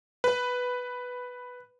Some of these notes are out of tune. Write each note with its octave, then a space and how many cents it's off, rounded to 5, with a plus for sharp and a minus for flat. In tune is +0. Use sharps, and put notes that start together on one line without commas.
B4 +0